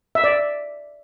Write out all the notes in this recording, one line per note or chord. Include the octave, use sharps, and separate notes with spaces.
E5
D5
E5